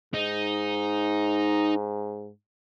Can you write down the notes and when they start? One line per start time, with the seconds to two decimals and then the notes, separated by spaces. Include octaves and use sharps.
0.14 G#2 D#4